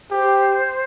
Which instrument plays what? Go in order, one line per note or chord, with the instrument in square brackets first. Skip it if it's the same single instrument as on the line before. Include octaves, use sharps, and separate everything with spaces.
[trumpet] G4 [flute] C5